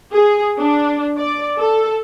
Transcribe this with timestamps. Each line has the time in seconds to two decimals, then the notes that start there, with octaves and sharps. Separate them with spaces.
0.13 G#4
0.59 D4
1.17 D5
1.58 A4